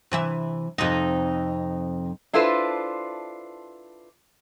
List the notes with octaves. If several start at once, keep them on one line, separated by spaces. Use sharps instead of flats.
C3 E3 E5
F2 C3 D#4
D4 E4 F4 A4 B4 C5